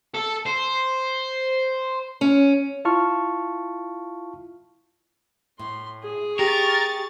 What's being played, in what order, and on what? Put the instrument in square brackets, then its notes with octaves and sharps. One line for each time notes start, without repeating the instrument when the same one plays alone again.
[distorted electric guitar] A4
C5
[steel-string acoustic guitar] C#4
[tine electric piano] E4 F4 A5 C#6 F6
[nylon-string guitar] A2 [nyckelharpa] C6
[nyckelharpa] G#4
[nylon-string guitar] G4 [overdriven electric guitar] A#4 [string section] C#6 A6